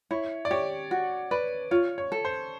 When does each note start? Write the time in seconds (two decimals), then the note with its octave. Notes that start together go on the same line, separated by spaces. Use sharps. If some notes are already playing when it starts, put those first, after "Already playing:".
0.11 E4 C#5
0.45 D5
0.51 G4 C#5
0.91 F#4
1.31 B4 D5
1.71 F4 C#5
1.98 C#5
2.12 A4
2.25 C5